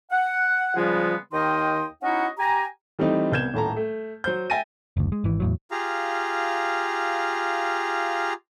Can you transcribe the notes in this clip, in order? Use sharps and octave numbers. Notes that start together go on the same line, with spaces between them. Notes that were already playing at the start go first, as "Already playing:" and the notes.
F#5
C#3 F3 G3 G#3 B3 F4
D#2 D#3 D#4 D#5 G5 C6
C#4 D#4 E4 F#4 D#5 F#5
G4 G#5 A#5
E3 G3 A3 C4 D#4 D#5
C2 B3 G6 G#6 E7
D#1 A2 A5 A#5
A3
F#3 C5 G6
E5 G5 G#5 A6 A#6 D#7
F#1 D2
G#3
G#1 E3
E2 A2 F#3
F4 G4 G#4 F5 A#5